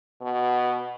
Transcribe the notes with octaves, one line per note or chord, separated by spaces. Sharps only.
B2